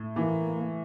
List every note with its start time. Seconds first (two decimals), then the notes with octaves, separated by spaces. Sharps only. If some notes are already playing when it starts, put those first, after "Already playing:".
Already playing: A2
0.16 E3 A#3